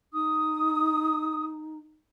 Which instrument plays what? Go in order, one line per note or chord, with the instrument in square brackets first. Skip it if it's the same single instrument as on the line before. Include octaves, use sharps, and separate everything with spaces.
[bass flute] D#4 [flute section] D#6